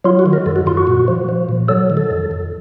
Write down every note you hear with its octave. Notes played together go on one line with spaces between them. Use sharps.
F#3 F4
F#4
D#3
A#4
F#2 A4
F#4
F#2 F4
F#4
A#2
F3
F3
A#2
F#3 A4
D#3
A4
F2
F2